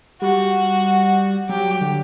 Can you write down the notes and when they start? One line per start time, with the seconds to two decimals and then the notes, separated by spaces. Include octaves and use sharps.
0.21 G3 F#4
1.49 F#3 G4
1.81 D3